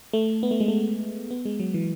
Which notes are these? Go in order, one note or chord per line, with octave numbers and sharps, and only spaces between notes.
A3
B3
A3
G#3
A3
B3
G#3
F#3
E3